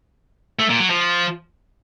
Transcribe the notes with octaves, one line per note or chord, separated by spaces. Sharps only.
A3
A#2
F#3
F3